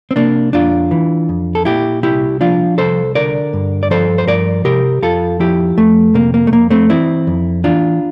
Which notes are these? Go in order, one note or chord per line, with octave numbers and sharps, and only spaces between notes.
C4
C3 A#3 D4
F2 D4 F4
E3
F2
A4
A#2 E4 G4
C2 E4 G4
F3 D4 F4
C2 A4 C5
D3 A#4 D5
G2
D5
F3 A4 C5
C5
G2 A#4 D5
C3 G4 A#4
F2 F4 A4
F3 E4 G4
F2 A3
C3 A#3
A#3
A3
F2 A#3
A3 C4
E3 C4 E4
F2
E3 D4 F4